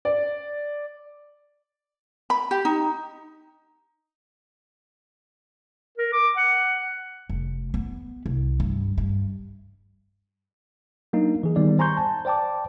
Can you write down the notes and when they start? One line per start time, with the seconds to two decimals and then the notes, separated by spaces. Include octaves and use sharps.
0.05 D5
2.30 B5
2.51 G4
2.65 D#4
5.98 A#4
6.13 D6
6.37 F#5
7.29 F1
7.74 B3
8.26 C2
8.60 G2
8.98 G2
11.13 F#3 A#3 D4 D#4
11.43 E3 G#4
11.56 D#3 G3 B3 D#4 D5
11.79 C5 G#5 A#5 C6 C#6 G6
11.97 A5
12.25 C5 D5 G5 A5 D6